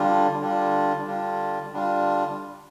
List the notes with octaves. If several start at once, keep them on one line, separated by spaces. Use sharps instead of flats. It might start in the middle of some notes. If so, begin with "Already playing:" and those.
Already playing: D3 G3 D4 F4
D3 G3 D4 F4
D3 G3 D4 F4
D3 G3 D4 F4